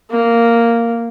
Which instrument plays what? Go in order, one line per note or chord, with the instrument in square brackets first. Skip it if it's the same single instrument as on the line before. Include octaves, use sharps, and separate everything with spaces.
[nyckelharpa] A#3